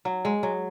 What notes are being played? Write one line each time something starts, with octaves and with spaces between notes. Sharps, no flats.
F#3
G#3
F#3